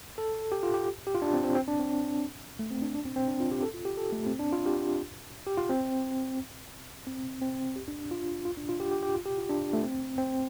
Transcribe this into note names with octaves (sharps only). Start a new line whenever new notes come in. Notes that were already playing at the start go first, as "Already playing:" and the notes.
A4
G4
F4
G4
G4
F4
D4
C4
C4
C4
D4
C4
A3
C4
D4
D4
C4
C4
D4
F4
G4
A4
F4
G4
A4
A3
C4
D4
F4
G4
G4
F4
C4
C4
C4
G4
D4
D4
F4
F4
D4
F4
G4
G4
G4
F4
G4
F4
D4
A3
C4
C4